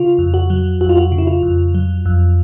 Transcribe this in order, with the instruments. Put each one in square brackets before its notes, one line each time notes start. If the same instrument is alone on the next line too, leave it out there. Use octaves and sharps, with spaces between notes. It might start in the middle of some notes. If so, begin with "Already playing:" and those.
Already playing: [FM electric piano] C#3 F4
F2
F#4
F#3
F2 F#4
F4
F#4
C#3
E4
F4
F2
F#3
F2